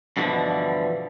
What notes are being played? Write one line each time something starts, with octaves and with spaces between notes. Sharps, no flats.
G2 B2 D3 E3 F3